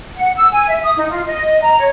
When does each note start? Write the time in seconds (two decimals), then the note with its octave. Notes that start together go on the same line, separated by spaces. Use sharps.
0.17 F#5
0.36 E6
0.52 G#5
0.68 E5
0.83 D#6
0.97 D#4
1.10 F4
1.27 D#5
1.62 A#5
1.78 C#5